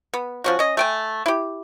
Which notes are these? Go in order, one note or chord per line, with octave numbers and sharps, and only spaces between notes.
B3
F3 C#4 F#4
C#4 D#5
A3 G5 G#5
E4 G4